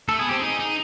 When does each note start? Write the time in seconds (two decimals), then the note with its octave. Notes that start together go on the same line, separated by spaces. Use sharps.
0.09 A3 A4
0.19 B3 G#4
0.29 C4 G4
0.40 D#4 G#4
0.59 D#4